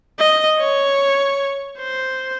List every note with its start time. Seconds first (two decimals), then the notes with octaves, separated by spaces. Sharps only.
0.19 D#5
0.59 C#5
1.79 C5